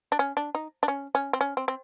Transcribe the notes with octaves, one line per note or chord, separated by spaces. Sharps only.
D4
C#4
D4
D#4
D4
C#4
C#4
C4
C#4
C4
C4